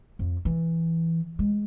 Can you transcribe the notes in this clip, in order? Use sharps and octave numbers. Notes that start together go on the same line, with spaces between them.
F2
E3
G#3